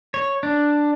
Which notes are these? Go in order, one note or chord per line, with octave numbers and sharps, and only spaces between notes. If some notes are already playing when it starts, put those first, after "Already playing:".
C#5
D4